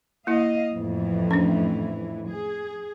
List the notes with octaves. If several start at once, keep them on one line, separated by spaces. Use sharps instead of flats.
A#3 E4 D#5 F5
F2 A2 E3
C#4 D4
G#4